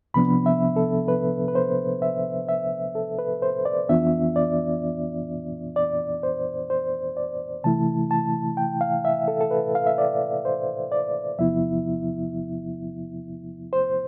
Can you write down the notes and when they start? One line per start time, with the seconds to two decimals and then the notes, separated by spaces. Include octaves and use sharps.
0.14 C2 C3 F3 B3 D4 B5
0.46 E5
0.76 A4
1.08 B4
1.48 B4
1.55 C5
2.02 E5
2.49 E5
2.95 A4
3.19 B4
3.42 C5
3.65 D5
3.89 F2 E3 B3 D4 F4 E5
4.36 D5
5.76 D5
6.23 C5
6.70 C5
7.17 D5
7.64 C3 E3 A3 E4 A5
8.11 A5
8.57 G5
8.81 F5
9.05 E5
9.28 A4
9.41 A4
9.51 B4
9.75 F5
9.87 E5
9.98 D5
10.45 C5
10.92 D5
11.38 E2 C3 F3 B3 E4 E5
13.73 C5